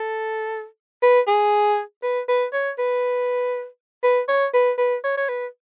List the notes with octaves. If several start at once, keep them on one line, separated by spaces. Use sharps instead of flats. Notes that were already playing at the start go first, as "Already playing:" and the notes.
Already playing: A4
B4
G#4
B4
B4
C#5
B4
B4
C#5
B4
B4
C#5
C#5
B4